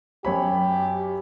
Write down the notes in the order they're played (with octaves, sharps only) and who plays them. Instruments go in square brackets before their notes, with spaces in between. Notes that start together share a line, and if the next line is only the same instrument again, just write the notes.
[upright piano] F#2 C#5 B5 [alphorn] G4